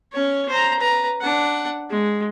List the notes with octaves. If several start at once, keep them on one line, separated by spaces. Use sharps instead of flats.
C#4 C#5
C5 A#5
B4 A#5
D4 F#5
G#3